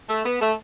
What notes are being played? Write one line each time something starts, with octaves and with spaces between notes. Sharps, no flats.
A3
B3
A3